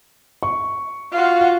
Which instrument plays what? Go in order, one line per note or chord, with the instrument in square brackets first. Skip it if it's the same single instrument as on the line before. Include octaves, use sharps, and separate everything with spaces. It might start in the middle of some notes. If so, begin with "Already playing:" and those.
[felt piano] C#6
[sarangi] F4 [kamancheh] F#4 F5